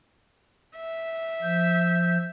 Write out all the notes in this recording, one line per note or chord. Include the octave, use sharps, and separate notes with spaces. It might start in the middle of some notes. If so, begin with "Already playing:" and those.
E5
F3 G6